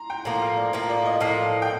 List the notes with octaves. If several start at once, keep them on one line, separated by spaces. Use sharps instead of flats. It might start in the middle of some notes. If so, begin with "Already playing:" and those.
Already playing: A#5 C6
G5
A2 F3 A#3 A#5
F5
D5
A2 F3 A#3
D5
D#5
A2 F3 A#3 F5
G5